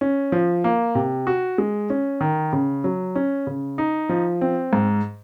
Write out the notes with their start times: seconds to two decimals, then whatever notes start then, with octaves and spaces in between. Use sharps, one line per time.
0.01 C#4
0.32 F3
0.64 A#3
0.95 C3
1.27 F#4
1.58 G#3
1.90 C#4
2.21 D#3
2.53 C#3
2.84 F#3
3.15 C#4
3.47 C#3
3.78 D#4
4.09 F3
4.41 C4
4.73 G#2